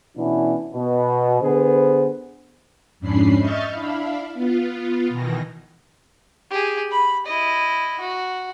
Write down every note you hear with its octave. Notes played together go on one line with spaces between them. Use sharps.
B2 E3 B3 C#4 D4 E4
B2
D3 B3 G#4 B4 C5
F2 G#2 C#4 D4 B5 C7
D#5 E5 C#6 F6 G6 A6
D4 E4 F5 B5
B3 F4
B2 D#3 E3 A#6
G4 G#4
B5
E4 D#5
F#4